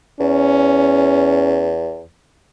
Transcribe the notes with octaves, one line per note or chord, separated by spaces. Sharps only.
E2 C#4